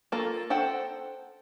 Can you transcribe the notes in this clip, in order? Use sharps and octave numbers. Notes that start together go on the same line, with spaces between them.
A#3 F4 A4
A4 C5 F#5 G5